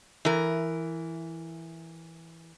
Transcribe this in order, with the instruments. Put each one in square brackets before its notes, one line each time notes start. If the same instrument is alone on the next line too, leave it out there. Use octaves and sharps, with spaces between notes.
[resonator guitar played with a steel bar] E3 A#4